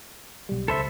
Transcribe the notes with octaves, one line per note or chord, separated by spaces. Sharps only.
B1 G3
C#2 A4 C5 E5 B5